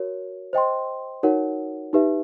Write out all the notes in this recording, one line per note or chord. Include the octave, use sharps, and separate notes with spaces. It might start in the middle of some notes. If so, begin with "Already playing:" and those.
Already playing: F#4 A#4 C#5
C5 D#5 G5 C6
D#4 F#4 A#4 C#5 F#5
D#4 G4 B4 E5